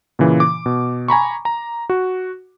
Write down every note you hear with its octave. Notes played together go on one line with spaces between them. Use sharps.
A#2 C#3 E3
D6
B2
G#5 A#5 B5 C#6
A#5
F#4